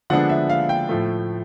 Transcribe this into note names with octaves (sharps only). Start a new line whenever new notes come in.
D3 F3 G#3 B3 D4 F#5
E5
F5
G5
A2 F3 A3